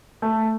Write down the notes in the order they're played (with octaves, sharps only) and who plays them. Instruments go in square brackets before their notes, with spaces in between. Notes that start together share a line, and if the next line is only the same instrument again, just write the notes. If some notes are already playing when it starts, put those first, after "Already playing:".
[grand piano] A3